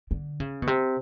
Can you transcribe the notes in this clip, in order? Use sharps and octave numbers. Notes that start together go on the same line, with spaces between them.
D3
C#3
B2
C3